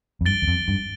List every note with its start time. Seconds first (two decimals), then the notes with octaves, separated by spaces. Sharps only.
0.21 F2
0.26 G2 A6 D7 G7
0.42 E2
0.47 F2
0.68 G2